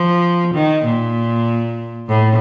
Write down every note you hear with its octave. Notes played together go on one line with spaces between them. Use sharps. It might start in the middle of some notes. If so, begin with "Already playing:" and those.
Already playing: F3
D#3
A#2
A2